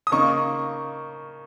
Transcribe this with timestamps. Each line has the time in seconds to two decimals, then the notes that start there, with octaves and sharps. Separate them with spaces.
0.07 D#6
0.12 C#3 A#3 D#4 C#6